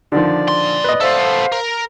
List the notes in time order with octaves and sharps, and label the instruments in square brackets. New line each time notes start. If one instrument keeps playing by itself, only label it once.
[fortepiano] D3 D#3 F3 [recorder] D5
[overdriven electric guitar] A#2 C6
[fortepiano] B4 D#5
[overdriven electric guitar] B3 A4 [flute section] C5 F5 [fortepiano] E5
[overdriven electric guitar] A#4